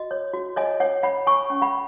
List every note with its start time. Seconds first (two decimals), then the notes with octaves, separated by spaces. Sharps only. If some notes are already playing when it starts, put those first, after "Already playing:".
Already playing: F#4 D#5
0.11 C#5
0.33 F#4
0.56 C#5 D#5 G#5
0.80 C#5 F#5
1.03 C#5 F#5 B5
1.27 C#5 G#5 C#6
1.50 C#4
1.62 F#5 B5